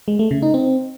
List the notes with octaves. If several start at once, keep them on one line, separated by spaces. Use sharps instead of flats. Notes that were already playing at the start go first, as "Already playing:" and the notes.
G#3
A3
C#3
D#4
C4